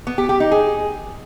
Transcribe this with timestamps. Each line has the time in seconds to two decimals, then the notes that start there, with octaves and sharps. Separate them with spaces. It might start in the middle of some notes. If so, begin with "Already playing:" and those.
0.07 B3
0.18 G4
0.29 G4
0.40 D#4
0.51 G#4